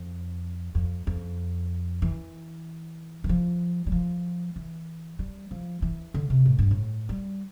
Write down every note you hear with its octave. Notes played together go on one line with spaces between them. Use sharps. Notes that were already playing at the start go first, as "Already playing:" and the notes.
Already playing: F2
F2
F2
E3
E3
F3
G3
F3
E3
G3
F3
E3
D3
C3
A2
G2
A2
G3